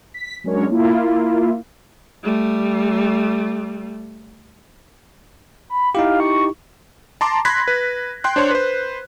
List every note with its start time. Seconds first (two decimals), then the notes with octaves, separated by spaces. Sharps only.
0.14 B6
0.44 F#3 G#3 C#4 D4 A#4 C#5
0.70 A#3 E4 F4
2.24 G3 A3
5.70 B5
5.95 D#4 E4 G4 F5
6.20 C#6
7.21 A5 A#5 C6 D6
7.45 B5 C6 F#6 G#6 A#6 B6
7.68 B4
8.24 G5 C6 F#6
8.36 D4 C5 C#5 C6
8.51 B4 C5